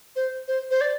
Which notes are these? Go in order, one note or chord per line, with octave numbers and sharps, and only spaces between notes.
C5
C5
C5
D5